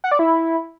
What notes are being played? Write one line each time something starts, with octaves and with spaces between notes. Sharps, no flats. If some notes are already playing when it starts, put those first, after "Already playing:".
F#5
D5
E4